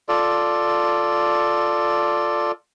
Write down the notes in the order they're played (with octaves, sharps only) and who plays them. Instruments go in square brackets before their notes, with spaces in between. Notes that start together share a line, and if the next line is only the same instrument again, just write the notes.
[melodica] F4 A4 D5